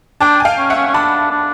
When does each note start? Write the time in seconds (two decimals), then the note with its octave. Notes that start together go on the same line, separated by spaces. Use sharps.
0.21 D4 G5 A5
0.40 G#5
0.45 F5 G5
0.58 C#4
0.70 E5 F#5
0.76 C#4
0.88 C#4
0.94 D4 A5 B5
1.31 D4